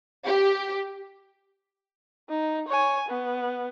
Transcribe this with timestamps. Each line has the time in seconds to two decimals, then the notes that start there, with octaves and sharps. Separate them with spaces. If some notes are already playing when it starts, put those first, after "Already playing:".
0.25 G4
2.29 D#4
2.68 C#5 G#5
3.09 B3